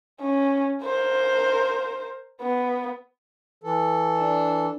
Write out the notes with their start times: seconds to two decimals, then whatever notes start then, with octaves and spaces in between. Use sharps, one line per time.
0.21 C#4
0.84 A#4 C5
2.41 B3
3.64 E3 A4
4.17 D4